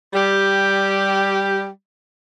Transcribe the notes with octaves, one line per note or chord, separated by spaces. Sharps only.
G3 G4